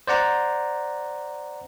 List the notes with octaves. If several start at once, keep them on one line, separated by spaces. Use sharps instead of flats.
C5 D5 F#5 A#5